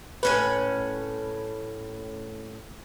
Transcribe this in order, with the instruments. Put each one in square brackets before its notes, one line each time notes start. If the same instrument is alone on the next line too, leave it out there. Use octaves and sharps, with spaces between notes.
[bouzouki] A2 C#4 B4